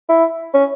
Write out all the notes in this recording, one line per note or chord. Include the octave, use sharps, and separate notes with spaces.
E4
C#4